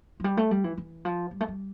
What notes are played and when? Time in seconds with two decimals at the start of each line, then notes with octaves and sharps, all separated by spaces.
0.20 F3
0.24 G3
0.37 A3
0.51 G3
0.64 E3
0.77 E3
1.05 F3
1.31 G3
1.40 A3
1.48 G3